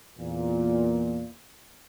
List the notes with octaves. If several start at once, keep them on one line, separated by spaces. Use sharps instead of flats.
E2 A#2